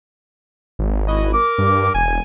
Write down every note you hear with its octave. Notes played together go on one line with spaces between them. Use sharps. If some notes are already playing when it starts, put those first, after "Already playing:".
G#1
E4 F#4 D#5
A#4 D6
G2
E1 G#5